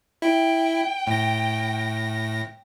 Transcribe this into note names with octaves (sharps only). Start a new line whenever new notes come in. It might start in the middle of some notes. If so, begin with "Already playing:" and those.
E4 G5
A2 A#6